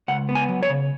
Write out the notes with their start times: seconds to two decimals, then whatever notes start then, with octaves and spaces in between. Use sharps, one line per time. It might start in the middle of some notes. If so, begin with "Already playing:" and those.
0.08 C#2 F#5
0.29 B3
0.35 G#5
0.49 F#3
0.63 C#5
0.69 C#3